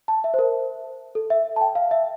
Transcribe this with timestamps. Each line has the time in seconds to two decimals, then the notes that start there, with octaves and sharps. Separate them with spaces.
0.08 A5
0.24 E5
0.34 C5
0.39 A#4
1.15 A4
1.30 E5
1.56 A5
1.61 G5
1.75 F5
1.91 E5